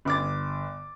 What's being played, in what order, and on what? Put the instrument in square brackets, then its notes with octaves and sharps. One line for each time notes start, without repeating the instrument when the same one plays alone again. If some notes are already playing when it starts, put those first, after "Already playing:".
[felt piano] G1 D6 A6